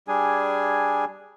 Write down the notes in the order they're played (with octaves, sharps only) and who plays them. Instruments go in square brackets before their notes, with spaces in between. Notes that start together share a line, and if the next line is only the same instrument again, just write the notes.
[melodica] G3 D4 G#4 G#5